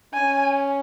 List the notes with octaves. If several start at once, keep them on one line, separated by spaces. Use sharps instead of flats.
C#4 G#5